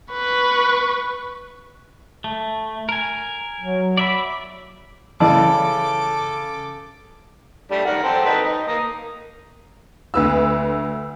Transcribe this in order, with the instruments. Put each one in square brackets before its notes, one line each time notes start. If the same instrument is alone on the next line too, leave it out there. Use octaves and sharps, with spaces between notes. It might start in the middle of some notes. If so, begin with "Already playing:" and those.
[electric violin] B4 C#6
[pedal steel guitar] A3
A#4 G#5
[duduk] F#3
[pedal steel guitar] D5 E5 B5
[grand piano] C#3 [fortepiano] E3 D5 [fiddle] A4 D6 [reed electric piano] A5
[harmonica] G3 A3 D4
D#3 A#4 F#5
A4 C5 G5
D#4 A4 B4
D#4
A#3 A#5 D#6
[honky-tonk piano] D2 B4 E6